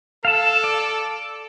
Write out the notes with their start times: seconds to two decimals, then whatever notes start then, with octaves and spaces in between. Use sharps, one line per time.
0.25 A4 F5 A5
0.64 D5